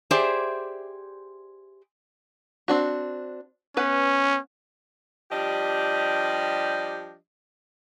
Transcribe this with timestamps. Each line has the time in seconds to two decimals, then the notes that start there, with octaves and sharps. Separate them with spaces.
0.11 G4 G#4 C5 D5 E5
2.68 C4 D4 F#4
3.77 B3 C#4 B4 F#5
5.31 F3 G3 D4 G4 D#5